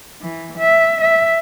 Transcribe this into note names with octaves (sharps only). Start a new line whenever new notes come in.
E3
E5
E5